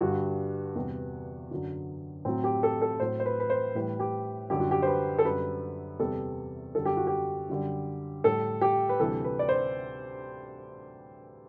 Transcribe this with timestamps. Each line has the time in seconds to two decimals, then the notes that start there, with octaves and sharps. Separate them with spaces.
0.01 G2 D3 G3 F#4
0.76 E2 C3 G3
1.51 F#2 D3 F#3
2.25 A2 F#3 C4
2.44 G4
2.63 A4
2.82 A4
3.00 A2 F#3 C5
3.20 C5
3.26 B4
3.40 B4
3.50 C5
3.75 A2 E3 G3 B4
3.99 G4
4.50 F#2 D3 G3 G4
4.60 F#4
4.71 G4
4.82 C5
4.87 B4
5.19 A4
5.25 F#2 D3 G3 B4
6.00 E2 C3 G3 A4
6.75 F#2 D3 G3 A4
6.85 G4
6.97 F#4
7.07 G4
7.49 F#2 D3 G3
8.24 A2 G3 A4
8.61 G4
8.89 B4
8.99 D2 C3 E3 G3 A4
9.24 B4
9.39 D5
9.49 C5